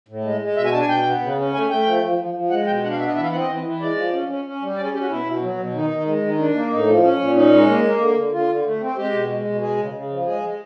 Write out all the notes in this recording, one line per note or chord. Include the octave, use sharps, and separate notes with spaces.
A2
G#3
G#3
B2 E5
G#5
D4 A5
G#5
B2 G5
B3
C#3
C#4
A3 G#5
A3 G5
F3
F3
F3
F3
G#3 F#5
B2 G5
D4 F#5
F5
B3 E5
D#5
E3 E5
F5
C4 F#5
D#5
E3
E3
G#3 D5
F3
C#4
C#4
C#4
G3
C#4 D5
G#4
C#4 G4
F#4
B2 E4
B2
F#3
B2
D#3 D#4
D#3
G#3
D#3
D4
A#3
A2 D#4
F3
C#4
A#2
C#4 D#4
G#3
A#3
A#3
D3
D3
D3 F4
D3
A3
C4
G#3 G4
B2
G#3
B2
G#3 G#4
C#3
C#3
F3
G#3 G#4
G#3